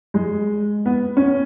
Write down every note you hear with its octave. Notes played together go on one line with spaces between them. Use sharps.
G#3
B3
C#4